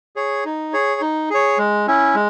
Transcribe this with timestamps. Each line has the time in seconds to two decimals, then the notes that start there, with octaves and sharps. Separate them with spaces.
0.16 G#4 C#5
0.45 D#4
0.73 G#4 C#5
1.01 D#4
1.30 G#4 C#5
1.58 G#3
1.87 C#4 E4
2.15 G#3